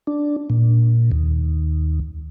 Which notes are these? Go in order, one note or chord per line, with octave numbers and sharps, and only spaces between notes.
D4
A#2
D#2